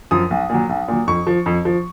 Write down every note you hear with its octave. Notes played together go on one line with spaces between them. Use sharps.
F#2 F3 D#6
B1
A#2 F#3
B1
A#2 F#3
F2 C#6
F3
F2
F3